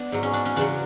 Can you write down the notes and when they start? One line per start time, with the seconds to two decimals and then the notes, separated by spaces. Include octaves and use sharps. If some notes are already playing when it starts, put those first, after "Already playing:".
Already playing: B3 D4
0.12 G#2 F#3
0.23 C#4
0.34 D4
0.46 C#4
0.56 E2 C#3 F#3 D4